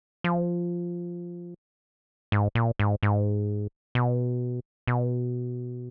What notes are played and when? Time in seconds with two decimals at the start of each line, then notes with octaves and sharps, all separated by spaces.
0.24 F3
2.32 G#2
2.55 A#2
2.79 G#2
3.03 G#2
3.95 B2
4.87 B2